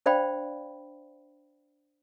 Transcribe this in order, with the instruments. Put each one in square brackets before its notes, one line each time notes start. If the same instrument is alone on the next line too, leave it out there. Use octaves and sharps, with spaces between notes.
[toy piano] D4 C5 D5 F5 G5 B5